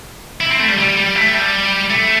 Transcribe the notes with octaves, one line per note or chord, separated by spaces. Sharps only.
E4
C4
A3
G3
G3
G3
A3
G3
A3